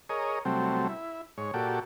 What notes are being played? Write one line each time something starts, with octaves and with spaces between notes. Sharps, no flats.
G#4 A#4 C#5 D#5
C3 F#3 G3 A3 C4
E4
G#2 C#5
A#2 F#4 G4 A4 D5